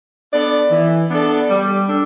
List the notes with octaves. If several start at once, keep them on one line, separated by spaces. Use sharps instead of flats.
B3 D4 A4 D5
E3
B3 D4 A4 D5
G3
D4 A4